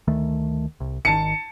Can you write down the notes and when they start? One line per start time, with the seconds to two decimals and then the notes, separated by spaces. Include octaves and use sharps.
0.08 D2 D#3 A3
0.80 C2
1.05 G#1 D#3 A5 C#7